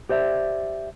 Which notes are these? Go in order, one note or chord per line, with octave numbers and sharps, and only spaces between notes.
G4 C5 D5 E5